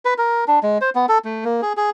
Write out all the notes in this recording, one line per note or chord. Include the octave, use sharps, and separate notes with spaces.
B4
A#4
D4
G#3
C5
B3
A4
A3
A#3
G#4
G#4